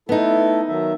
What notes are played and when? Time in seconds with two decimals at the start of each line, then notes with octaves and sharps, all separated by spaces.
0.09 A3 B3 D#4 E4 A4
0.68 D#3 F#3 E5